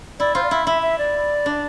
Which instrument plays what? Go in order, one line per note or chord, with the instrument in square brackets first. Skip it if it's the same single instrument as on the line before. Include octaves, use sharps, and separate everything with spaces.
[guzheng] E4 [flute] D5
[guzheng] F4 [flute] C5
[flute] D5
[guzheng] E4 [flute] E5
[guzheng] E4 [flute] E5
[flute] E5
D5
[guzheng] D4